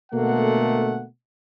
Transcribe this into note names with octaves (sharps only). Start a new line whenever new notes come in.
B2 D3 A3 A#3 A4 F#5